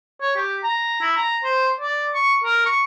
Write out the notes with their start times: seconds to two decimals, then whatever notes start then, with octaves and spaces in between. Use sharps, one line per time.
0.22 C#5
0.36 G4
0.64 A#5
1.01 E4
1.16 A#5
1.44 C5
1.80 D5
2.15 C#6
2.44 A#4
2.66 C#6